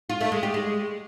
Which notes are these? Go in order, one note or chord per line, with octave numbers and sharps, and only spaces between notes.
F4
A3
G#3
G4
G#3